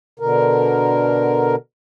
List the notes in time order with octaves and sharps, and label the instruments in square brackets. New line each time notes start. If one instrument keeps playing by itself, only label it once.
[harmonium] B2 D3 A#4